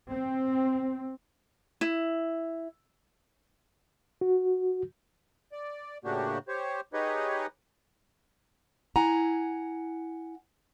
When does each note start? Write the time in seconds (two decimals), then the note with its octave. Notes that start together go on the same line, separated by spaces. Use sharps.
0.10 C4
1.81 E4
4.21 F#4
5.52 D5
6.04 A2 C#3 A#3 D4 F#4 G4
6.48 G4 C5 C#5
6.93 D#4 G4 G#4 B4 C#5 D#5
8.96 E4 F#5 G#5 A#5